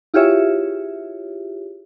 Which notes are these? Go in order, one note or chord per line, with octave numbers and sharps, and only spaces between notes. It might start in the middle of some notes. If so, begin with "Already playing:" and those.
E4 F4 G4 G#4 C#5 E5